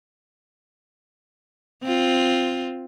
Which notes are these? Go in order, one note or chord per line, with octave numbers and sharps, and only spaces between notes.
C4 F4